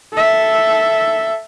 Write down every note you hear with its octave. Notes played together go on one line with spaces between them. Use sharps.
A4 E5